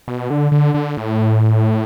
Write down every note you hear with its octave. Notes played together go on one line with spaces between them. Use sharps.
B2
D3
D3
D3
A2